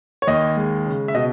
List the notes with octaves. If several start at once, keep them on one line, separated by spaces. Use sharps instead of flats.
C#5
D#2 D#5
G#3
C#3
E5
B2 D#5